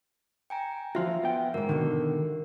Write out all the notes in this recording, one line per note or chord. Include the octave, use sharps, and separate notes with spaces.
G5 G#5 A#5
F3 F4 F#4 E5
B3 G5
F2 G#2 A#4
B2 D3 D#3